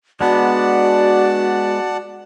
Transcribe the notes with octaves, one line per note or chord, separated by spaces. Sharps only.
G#3 B3 D4 F#4 D5 F#5 A5